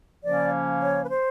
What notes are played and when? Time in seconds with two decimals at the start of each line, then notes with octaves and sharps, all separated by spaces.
0.23 C#3 F3 A#3 C#4 D5
0.82 C#5
1.04 B4
1.10 C5